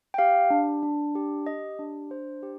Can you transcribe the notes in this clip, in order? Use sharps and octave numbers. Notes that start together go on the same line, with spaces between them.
G5
G4 F5
D4
D4
G4
G4 D#5
D4
D4 C5
G4